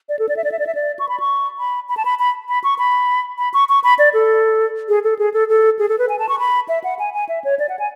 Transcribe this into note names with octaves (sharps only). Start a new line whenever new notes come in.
D5
A4
D5
E5
D5
E5
D5
E5
D5
C#6
B5
C#6
B5
B5
A5
B5
B5
B5
C#6
B5
B5
C#6
C#6
B5
D5
A4
G#4
A4
G#4
A4
A4
G#4
A4
B4
G#5
A5
C#6
B5
E5
F#5
G#5
G#5
E5
C#5
D5
F#5
G#5